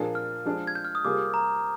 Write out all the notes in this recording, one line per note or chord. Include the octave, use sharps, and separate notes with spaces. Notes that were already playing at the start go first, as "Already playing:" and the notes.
Already playing: A#2 F3 A#3 D4 G#4
F6
F3 G#3 D4 G#4
G#6
G6
F6
D#6
C3 G3 A#3 F4 G#4 D6
A#5